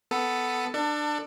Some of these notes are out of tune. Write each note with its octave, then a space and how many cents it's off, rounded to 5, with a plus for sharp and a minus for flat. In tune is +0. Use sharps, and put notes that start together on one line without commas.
B3 +10 A4 +0
D4 +20 A4 +30